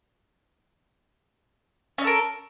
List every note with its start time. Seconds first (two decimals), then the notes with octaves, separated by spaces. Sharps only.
1.98 C#4
2.01 D#5
2.04 A4
2.07 A#4